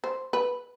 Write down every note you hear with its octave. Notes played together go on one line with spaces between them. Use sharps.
C5
B4